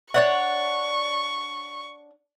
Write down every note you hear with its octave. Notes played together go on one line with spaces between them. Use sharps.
D4 C#5 D5 E5 F#5 C#6